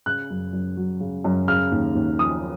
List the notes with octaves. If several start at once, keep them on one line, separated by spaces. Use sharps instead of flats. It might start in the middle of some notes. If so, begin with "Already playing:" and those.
C#3 F#6
F#2
F#2
F#3
C#3
F#2
C#3 F6
D#2
D#2
F3 D#6